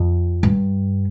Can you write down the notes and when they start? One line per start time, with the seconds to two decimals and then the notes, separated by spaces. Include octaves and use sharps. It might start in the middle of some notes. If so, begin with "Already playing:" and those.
Already playing: F2
0.43 G2